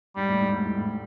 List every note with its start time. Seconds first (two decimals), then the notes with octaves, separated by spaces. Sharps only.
0.16 G#2 G3
0.29 A2
0.41 G#2
0.53 A2
0.65 G#2
0.77 A2